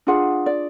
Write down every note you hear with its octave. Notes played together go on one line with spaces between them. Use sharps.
D4 F4 G#4 F#5
D5